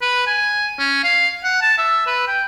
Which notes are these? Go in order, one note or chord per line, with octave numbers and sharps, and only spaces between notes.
B4
G#5
C#4
F5
F#5
A5
E5
B4
G5